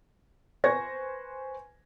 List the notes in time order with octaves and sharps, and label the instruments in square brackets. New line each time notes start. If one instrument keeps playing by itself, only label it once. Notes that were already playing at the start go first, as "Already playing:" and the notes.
[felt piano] B4 C5 G#5 C#6 G#6 A#6